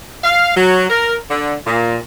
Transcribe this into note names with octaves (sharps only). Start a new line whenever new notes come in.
F5
F#3
A#4
D3
A#2